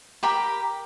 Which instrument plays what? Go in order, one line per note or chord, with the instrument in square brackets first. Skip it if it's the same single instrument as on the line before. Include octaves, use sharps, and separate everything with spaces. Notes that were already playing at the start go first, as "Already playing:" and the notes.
[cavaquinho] G4 A#4 B5